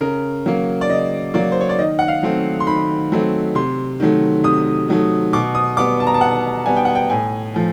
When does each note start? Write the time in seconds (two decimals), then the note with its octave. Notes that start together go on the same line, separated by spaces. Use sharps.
0.01 C#3 A#4
0.46 F#3 A#3
0.81 D5
0.89 C#3 D#5
1.34 F#3 A#3 D5
1.52 C5
1.61 C#5
1.69 D5
1.79 D#3 D#5
1.99 F#5
2.08 F5
2.23 F#3 A3 C4
2.60 C6
2.67 D#3 B5
3.12 F#3 A3 C4
3.55 C3 C6
4.00 D#3 F#3 A3
4.44 C3 D#6
4.88 D#3 F#3 A3
5.33 B2 D6
5.55 D#6
5.77 G3 B3 D6
6.00 A5
6.07 A#5
6.14 A5
6.21 B2 F#5
6.66 G3 B3 G#5
6.76 G5
6.85 F#5
6.95 G5
7.10 A2 G#5
7.54 F3 A3